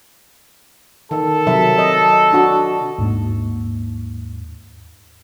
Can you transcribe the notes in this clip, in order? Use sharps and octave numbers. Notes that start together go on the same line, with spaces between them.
D#3 A4
C3 F#3 E5
D#5
D4 F#4
D#2 G#2 A#3